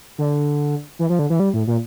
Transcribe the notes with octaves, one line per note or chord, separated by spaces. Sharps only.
D3
E3
F3
D3
E3
G3
A2
A#2